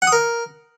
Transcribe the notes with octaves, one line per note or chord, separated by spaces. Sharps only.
F#5
D#6
A#4